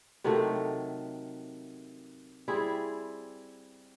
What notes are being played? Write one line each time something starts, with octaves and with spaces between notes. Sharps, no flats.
C3 D#3 F#3 A3
G3 C4 E4 G#4